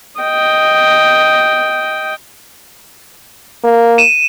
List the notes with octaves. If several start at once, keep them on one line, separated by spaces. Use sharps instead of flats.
D#5 G5
A#3
D#7 E7